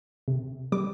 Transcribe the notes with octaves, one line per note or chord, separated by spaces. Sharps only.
C3
G3 D6